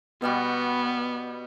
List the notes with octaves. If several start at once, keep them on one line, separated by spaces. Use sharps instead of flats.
B2 G3 B3 F#4